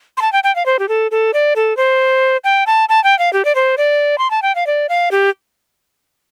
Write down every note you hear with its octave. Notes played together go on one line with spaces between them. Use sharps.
C6
A5
G5
G5
F5
C5
G4
A4
A4
D5
A4
C5
G5
A5
A5
G5
F5
G4
D5
C5
D5
C6
A5
G5
F5
D5
F5
G4